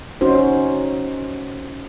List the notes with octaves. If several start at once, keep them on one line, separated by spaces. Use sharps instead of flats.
C#4 D#4 F#4 C5